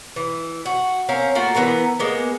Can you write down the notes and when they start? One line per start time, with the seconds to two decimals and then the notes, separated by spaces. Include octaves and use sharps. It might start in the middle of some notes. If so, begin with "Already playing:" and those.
0.16 E3
0.66 F#4
1.09 C4 C#4 A#4 F5
1.35 A3 A#3 F4 F#4
1.55 E3 B3 A#4 A#5
1.99 G#3 A#3 B3